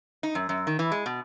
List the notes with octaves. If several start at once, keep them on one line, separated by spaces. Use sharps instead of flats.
D#4
F#2
F#2
D#3
E3
G#3
B2